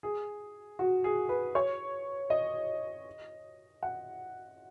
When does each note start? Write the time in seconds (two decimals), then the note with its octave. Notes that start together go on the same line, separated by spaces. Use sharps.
0.03 G#4
0.79 F#4
1.04 G#4
1.29 B4
1.55 C#5
2.30 D#5
3.83 F#5